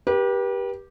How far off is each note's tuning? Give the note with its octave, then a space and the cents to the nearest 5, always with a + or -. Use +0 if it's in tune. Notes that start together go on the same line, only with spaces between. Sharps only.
G4 +0 B4 -40